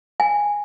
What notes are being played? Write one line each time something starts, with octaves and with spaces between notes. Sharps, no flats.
G#5